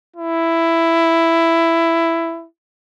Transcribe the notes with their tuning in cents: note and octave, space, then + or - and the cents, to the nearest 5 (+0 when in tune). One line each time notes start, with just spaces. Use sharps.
E4 +10